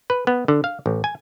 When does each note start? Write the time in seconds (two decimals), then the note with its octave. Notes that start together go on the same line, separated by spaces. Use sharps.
0.10 B4
0.27 B3
0.48 D3
0.64 F5
0.86 A1
1.04 G#5